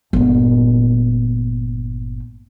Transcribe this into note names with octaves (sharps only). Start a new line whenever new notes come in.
G1 A#2